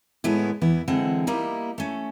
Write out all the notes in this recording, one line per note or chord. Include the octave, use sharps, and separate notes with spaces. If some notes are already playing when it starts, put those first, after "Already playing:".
A2 D#3 G#3 A3 B3 E4
E2 E3 B3 E4
D3 E3 G#3 C4 F#5
G3 A#3 D#4 E4
A3 C#4